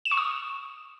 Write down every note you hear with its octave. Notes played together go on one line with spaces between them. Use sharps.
E7
C#6
D#6